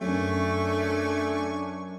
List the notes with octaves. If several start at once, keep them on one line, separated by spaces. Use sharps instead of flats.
F#2 A3 D4 G#5 C#6